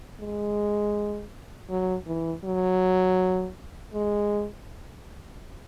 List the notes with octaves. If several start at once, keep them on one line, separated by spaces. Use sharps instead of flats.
G#3
F#3
E3
F#3
G#3